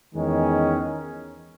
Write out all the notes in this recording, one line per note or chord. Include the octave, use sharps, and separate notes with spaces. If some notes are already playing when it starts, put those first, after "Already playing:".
E2 D#3 G#3 C#4